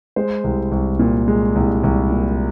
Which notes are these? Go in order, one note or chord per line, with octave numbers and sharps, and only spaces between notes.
G#3 C5
C2
C2
A#2
G#3
C2
C2
A#2